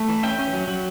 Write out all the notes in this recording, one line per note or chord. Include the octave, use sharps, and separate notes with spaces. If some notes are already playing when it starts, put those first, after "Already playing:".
Already playing: A3
E3
C#4 E5 G5
C#4
F#3
F#3